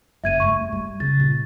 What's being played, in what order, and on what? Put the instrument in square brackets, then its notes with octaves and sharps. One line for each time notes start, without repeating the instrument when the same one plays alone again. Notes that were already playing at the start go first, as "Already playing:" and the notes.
[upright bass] F#1 [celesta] E5 G#6 D#7
[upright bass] G2 A3 [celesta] C#6
[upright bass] G3
[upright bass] C#3 [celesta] A6
[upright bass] A#2